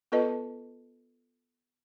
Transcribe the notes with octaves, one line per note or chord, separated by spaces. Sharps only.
B3 F4 A4 B4 D#5 A5